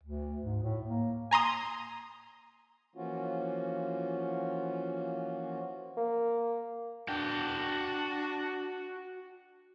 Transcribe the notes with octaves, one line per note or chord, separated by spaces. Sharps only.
D2
G#2
A2
A#3
G#5 A#5 C6 D#6
E3 F3 A#3 C#4 F4 F#4
A#3
D4 F#4 G5